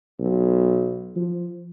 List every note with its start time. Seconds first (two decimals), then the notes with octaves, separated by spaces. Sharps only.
0.19 B1
1.16 F3